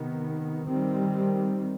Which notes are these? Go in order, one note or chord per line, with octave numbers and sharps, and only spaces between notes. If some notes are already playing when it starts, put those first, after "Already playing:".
Already playing: C3 D#3 B3
D#3 G3 C4